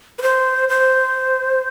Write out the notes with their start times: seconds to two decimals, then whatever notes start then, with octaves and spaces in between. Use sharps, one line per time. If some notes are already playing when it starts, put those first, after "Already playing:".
0.19 B4
0.22 C5
0.69 C5